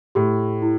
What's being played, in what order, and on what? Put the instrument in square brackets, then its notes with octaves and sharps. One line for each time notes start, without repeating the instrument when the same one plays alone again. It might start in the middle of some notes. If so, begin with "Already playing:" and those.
[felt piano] A2 [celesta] G4
[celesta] E4